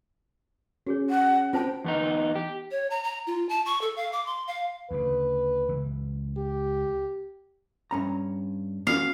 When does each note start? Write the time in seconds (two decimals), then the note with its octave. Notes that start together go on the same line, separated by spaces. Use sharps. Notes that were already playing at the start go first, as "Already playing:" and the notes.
0.87 C#4 F#4 G#4 C#5
1.09 F#5
1.53 C4 F4 C5 G5 A5
1.84 E2 B3 D#4
2.35 G4
2.71 C#5
2.90 A#5
3.04 A#5
3.27 F4
3.49 A5
3.65 C#6
3.81 A4
3.96 F5
4.12 D6
4.26 C6
4.48 F5
4.91 D2 C#3 B4
5.69 C#2 E3
6.37 G4
7.91 G2 C#4 A#5
8.87 B3 C#4 F#4 F5